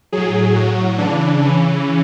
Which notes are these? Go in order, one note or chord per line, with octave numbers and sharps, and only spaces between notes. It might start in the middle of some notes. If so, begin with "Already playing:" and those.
A2 F#3 G#4
A2 F#3 F#4
C#3 E3 D4
C#3 E3 C#4